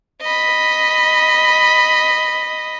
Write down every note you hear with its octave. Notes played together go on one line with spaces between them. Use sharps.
D#5 B5